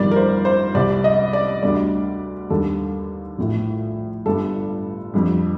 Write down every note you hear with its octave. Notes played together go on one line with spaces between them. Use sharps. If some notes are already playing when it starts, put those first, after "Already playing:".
Already playing: G1 F2 D#3 G3 D5
A#4
C5
C5
C2 C3 G3 D5
D#5
D5
D2 D3 G3 D5
D#2 D3 G3 A4
A#1 A2 F3
G1 G2 D3 G3 A4
F2 D3 G3